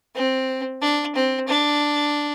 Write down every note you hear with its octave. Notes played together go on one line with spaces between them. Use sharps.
C4
D4
C4
D4